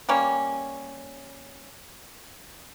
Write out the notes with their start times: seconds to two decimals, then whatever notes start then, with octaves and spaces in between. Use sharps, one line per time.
0.09 G3 A#3 C#4